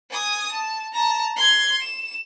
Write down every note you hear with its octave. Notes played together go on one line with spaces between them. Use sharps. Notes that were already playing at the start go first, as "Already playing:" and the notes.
G#5 D#6
A5
A5 A#5
C6 G#6
E7